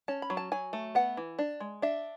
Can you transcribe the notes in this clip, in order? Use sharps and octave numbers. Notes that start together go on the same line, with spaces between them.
C#4 A5
B5
F#3
A5
F#3 G#5
A3
B3 F#5
E3
D4
G#3
D4 E5